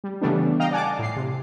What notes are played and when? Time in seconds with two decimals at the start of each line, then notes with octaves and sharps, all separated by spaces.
0.04 G3
0.21 C#3 E3 G3 A3 B3 D4
0.60 D#5 F5 G5 A#5
0.71 D5 F#5 G#5 A5 D6
0.99 A2 C7
1.16 C3